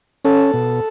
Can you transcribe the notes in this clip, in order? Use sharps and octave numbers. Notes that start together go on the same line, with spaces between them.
C#4 A4
B2